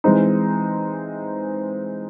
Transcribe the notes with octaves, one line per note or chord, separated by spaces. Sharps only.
E3 G#3 C4 D#4